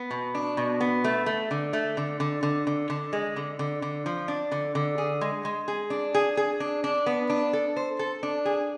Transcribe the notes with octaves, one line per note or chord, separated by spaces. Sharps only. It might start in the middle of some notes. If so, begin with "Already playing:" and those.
Already playing: B3
B2
D4
B2
B3
A3
A3
D3
A3
D3
D3
D3
D3
D3
G#3
D3
D3
D3
F3
D4
D3
D3
G#4
G#3
G#3
G#4
D4
G#4
G#4
D4
D4
B3
D4
A4
C5
A4
D4
G#4